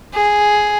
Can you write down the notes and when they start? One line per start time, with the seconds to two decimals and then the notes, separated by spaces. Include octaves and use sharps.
0.14 G#4